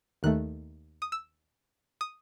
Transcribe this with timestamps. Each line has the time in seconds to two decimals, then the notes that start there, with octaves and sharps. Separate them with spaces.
0.23 D#2 D#3 A3 F#6
1.02 D#6
1.12 E6
2.01 D#6